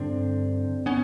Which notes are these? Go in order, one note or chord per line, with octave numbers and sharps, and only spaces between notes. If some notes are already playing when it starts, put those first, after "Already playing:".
Already playing: G2 D3 C4 D4
B3 C#4